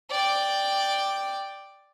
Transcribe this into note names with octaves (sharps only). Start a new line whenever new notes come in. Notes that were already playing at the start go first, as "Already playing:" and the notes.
D5 G5